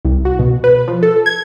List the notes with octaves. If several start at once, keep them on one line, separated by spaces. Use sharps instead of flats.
C2
F#4
B2
B4
F3
A4
G#6